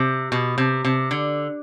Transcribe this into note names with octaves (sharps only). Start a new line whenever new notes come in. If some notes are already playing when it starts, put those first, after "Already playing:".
Already playing: C3
B2
C3
C3
D3